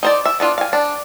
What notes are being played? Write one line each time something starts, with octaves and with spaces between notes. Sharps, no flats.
D#4 C5 D5
E5
B3 D4 F4
F5 G#5
D4